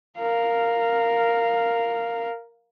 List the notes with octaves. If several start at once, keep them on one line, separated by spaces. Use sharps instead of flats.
A#4 F5